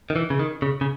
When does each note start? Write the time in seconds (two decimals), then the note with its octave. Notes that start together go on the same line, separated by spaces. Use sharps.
0.10 D#3
0.16 E3
0.30 C#3
0.39 D#3
0.62 C#3
0.81 C#3